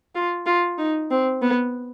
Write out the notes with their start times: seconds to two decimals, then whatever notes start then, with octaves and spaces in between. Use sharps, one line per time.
0.15 F4
0.46 F4
0.78 D#4
1.11 C4
1.42 B3